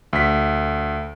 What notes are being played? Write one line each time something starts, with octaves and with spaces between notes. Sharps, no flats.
D2 B6